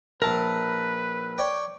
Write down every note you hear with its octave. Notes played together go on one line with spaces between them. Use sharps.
A#1 E4 A#4 B4 A5
C#5 D5 G5